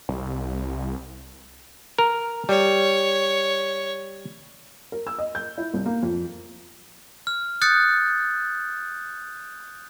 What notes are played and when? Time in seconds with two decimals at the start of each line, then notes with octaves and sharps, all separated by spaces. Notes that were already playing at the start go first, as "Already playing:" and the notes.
0.09 C2
1.98 A#4
2.49 G3 C#5
4.92 A#4
5.07 E6
5.18 D#5
5.35 G6
5.58 E4
5.74 C2
5.86 A#3
6.03 F2
7.27 F6
7.62 D#6 F#6 G6 A6 C#7